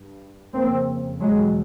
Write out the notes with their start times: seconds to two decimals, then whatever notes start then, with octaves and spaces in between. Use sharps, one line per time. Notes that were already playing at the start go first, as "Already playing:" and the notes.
Already playing: G2
0.53 F2 C#3 A#3 C4
1.20 E2 B2 F#3 G#3